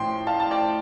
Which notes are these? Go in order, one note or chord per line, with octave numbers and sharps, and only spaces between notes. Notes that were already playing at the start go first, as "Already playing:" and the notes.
Already playing: A2 F3 G5 C6
F5 A5
A5
D5 G5